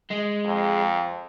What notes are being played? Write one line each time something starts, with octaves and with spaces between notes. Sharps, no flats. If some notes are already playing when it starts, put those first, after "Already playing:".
G#3
F2